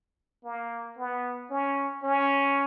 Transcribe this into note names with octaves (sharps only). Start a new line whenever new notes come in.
A#3
B3
C#4
C#4